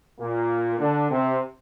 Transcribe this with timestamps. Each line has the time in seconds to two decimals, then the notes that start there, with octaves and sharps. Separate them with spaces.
0.20 A#2 A#3
0.80 D3 D4
1.10 C3 C4